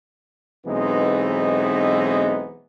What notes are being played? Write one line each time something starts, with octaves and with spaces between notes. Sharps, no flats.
B1 E3 G#3 B3 C4 D#4